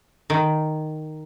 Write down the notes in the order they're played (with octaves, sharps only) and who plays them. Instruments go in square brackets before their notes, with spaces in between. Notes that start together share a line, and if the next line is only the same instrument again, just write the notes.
[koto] D#3